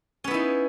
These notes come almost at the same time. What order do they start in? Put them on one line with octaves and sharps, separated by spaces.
C#4 B3 E4 D#4